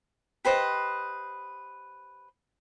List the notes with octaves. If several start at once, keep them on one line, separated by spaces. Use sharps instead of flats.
G4 B4 C5 D#5